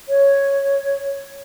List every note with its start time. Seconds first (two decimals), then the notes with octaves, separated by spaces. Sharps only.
0.08 C#5